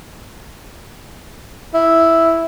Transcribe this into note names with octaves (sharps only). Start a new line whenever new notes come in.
E4